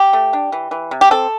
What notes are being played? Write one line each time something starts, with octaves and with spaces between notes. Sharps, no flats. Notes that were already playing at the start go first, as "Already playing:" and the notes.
Already playing: G4
A3
D4
E3
E3
C3
G4
C4 A4